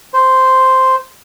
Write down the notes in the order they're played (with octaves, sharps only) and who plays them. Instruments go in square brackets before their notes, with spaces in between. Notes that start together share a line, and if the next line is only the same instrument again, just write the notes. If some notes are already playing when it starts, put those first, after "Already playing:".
[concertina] C5